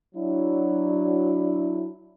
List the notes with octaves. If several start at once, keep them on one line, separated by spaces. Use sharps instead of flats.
F#3 D4 E4